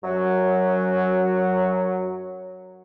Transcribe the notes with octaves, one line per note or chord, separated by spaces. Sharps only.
F#2 F#3